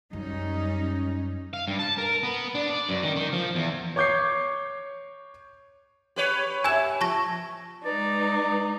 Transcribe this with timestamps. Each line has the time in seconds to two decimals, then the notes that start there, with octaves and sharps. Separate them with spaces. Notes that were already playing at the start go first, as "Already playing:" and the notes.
0.13 F#2 G3 C#4 D#4
1.53 F5
1.68 G2
1.79 A5
1.98 A#4
2.23 B3
2.55 D4
2.70 D5
2.89 F#2
3.03 D#3
3.16 D#3
3.33 F3
3.55 E2
3.96 C#5 C#6 D6 G6 G#6 C7
6.16 G4 B4 C#5
6.64 E5 G#5 E6 G#6 E7
7.01 F3 A5 C#6 A#6
7.85 G#3 D#4 B4 D5